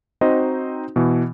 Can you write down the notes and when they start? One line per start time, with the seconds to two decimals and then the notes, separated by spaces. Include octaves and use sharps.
0.21 C4 D#4 F#4 C5 D#5
0.96 B2 E3